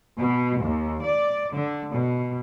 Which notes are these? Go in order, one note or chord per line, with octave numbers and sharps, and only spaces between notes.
B2
D#2
D5
D3
B2